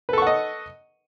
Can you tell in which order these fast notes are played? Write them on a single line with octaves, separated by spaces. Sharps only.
B4 A4 C#6 F#5 D#5